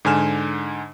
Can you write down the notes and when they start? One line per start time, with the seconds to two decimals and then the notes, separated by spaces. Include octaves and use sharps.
0.05 G#2 D3 G#5 F6 E7